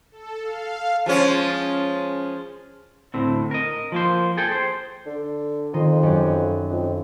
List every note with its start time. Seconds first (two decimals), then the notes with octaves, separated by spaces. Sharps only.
0.12 A4
0.42 F5
1.06 F3 G#3 C#4
3.14 D2 A2 C4
3.51 A#4 D#5
3.92 F3 A#3 C5
4.37 G#4 A4 G5
4.52 C5
5.06 D3
5.74 F2 D#3 D#5 C6
6.03 F#2 G4
6.70 F2